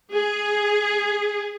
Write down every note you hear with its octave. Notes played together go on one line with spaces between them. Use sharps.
G#4